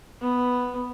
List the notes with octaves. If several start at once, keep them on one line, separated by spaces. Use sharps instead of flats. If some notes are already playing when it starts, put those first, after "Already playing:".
B3